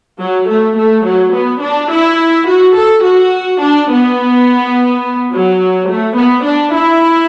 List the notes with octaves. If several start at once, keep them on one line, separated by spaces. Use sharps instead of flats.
F#3
A3
A3
F#3
B3
D4
E4
F#4
A4
F#4
D4
B3
F#3
A3
B3
D4
E4